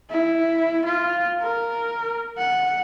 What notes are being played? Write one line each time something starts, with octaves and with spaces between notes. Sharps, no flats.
E4
F4
A#4
F#5